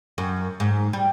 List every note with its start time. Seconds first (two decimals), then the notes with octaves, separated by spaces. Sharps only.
0.18 F#2
0.60 G#2
0.93 G3